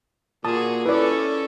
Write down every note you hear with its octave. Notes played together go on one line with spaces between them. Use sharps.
A#2 F#4 G#4 A5 D#6
C#4 E4 A4 B4 D5